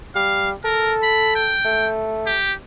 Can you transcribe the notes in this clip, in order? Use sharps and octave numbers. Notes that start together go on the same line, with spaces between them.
G3 F5
A4 A#4
B5
G5
A3
G4